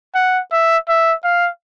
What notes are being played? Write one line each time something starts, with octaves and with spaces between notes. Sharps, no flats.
F#5
E5
E5
F5